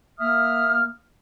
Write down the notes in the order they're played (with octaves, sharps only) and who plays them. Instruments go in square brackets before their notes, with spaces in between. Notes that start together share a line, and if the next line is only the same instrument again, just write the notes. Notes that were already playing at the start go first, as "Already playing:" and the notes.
[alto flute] A#3 [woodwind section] E5 D#6 F6